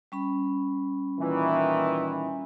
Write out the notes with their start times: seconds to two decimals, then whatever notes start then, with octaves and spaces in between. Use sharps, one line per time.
0.12 G3 C#4 B5
1.20 A#2 D#3 E3